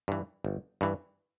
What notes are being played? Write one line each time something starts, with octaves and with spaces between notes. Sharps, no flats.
G2 E3
G1
G2 E3